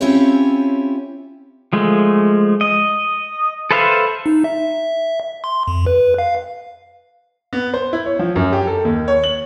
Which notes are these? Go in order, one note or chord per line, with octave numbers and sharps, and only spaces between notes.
C4 C#4 E4 F4 G4 C#5
F3 G#3 A3
D#5
A4 B4 C5 E5 F5
D#4
E5
C6
F2
B4
F5
B3
C5
E4
C#5
F3
F#2
G4
A4
D#2
C#5
F#7